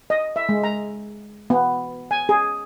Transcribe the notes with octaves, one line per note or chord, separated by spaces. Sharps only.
D#5
E5
G#3
A#5
B3
G#5
G#4